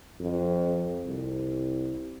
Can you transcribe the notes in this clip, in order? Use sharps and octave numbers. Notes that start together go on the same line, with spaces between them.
F2
C2